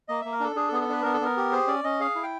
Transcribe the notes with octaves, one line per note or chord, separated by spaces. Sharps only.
A#3 D#5
A#3 E5
A#4
D4 A4
D4 G#4
A4
B3 G#4
A4
D4 B4
B3 A#4
A4
B3 A#4
G4
G#4 C5
C#4 D5
C#4 D#5
G#4 F5
E4
G5